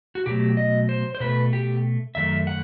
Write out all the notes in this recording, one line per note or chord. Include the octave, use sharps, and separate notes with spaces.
F#4
B2 F#3 A3 G4
D#5
C5
C5
B2 A3 B4
G4
F#2 D#3 A3 E5
F#5